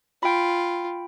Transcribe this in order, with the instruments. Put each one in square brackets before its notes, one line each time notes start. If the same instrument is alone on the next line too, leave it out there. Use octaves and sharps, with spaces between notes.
[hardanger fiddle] F4 [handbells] G5 B5